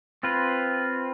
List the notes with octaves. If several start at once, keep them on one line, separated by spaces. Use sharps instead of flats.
C4 F4 B4